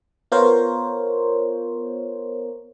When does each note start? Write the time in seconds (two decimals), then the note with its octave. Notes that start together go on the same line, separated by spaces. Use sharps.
0.32 B3 F4 A#4 C5 C#5